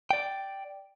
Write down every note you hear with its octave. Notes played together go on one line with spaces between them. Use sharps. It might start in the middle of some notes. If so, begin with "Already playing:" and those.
D5 G5